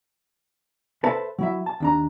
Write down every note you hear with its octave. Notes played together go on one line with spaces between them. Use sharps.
A4 B4 C5 E5 A5
F#3 E4 E5
A5
D#2 D4 A#5